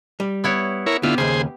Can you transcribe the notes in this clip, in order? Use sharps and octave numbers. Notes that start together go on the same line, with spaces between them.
G3
B3 E4 C#5
E4 A#4 C#5
D3 B3 E4 F4 G4
D#2 C#3 G#4 C5